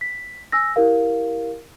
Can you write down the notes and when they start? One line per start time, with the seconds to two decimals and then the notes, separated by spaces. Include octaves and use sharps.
0.01 B6
0.52 G#5 E6 A#6
0.76 E4 G4 A#4 F5